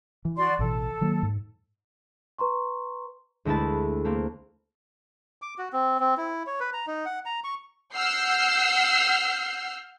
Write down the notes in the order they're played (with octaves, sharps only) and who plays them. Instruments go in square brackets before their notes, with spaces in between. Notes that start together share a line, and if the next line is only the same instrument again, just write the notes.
[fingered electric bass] E3
[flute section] F#4 D5 C6
[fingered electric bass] A1 B2 E3 [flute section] A4
[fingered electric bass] D#3 F#3 A#3
G#2
[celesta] B4 A#5 C6 C#6
[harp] D2 G#3 A3 E4 B4 A5
A3 A#3 C4
[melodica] D6
F#4
C4
C4
E4
C#5
B4
A#5
D#4
F#5
A#5
C#6
[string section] F#5 E6 F6 G6 C7